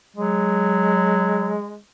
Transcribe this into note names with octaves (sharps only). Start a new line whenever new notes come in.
F#3 G#3